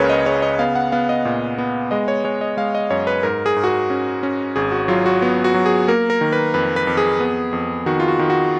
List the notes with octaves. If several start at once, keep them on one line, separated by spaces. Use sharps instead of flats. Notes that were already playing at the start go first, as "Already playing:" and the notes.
Already playing: C#2 C#3 A#3 A#4 B4 C#5
D#5
C#3 C#5
D#5
B3 F5
F#5
B3 F5
D#5
A#2
B3
G#3 D#5
C#5
G#3 C#5
D#5
G#3 F5
D#5
F#2 C#5
B4
G#2 A#4
G#4
G#2
F#4
G#4
C#4
C#4
G#1 G#4
F#4
F#3 F4
F#4
B3
F#4
F#3
G#4
A#3 A#4
A#4
D#3
B4
F2 B4
B4
F2
G#4
B3
F2
D#3 F#4
F4
F#4
D#3
F#4